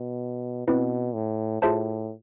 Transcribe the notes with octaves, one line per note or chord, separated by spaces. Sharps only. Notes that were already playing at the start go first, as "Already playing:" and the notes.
Already playing: B2
B2 C4 E4 B4
A2
A2 F4 G#4 C5 E5 A5